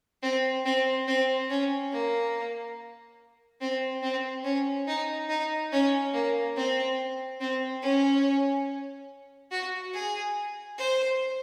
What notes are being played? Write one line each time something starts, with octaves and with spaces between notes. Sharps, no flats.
C4
C4
C4
C#4
A#3
C4
C4
C#4
D#4
D#4
C#4
A#3
C4
C4
C#4
F#4
G#4
C5